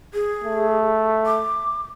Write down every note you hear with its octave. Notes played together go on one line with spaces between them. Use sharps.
G#4
A3
D6